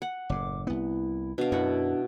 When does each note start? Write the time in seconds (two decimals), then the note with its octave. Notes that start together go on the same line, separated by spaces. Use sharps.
0.02 F#5
0.29 F#1 A2 D6
0.67 C2 B3 E4
1.38 B2 D4 F5
1.52 F#2 E4 F#5